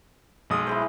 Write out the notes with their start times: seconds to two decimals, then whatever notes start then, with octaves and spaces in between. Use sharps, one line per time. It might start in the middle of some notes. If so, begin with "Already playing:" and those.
0.50 B1 G#3 D#6
0.67 E4 G#4 C5